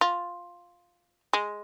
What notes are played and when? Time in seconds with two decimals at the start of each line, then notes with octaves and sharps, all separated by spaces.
0.01 F4
1.33 G#3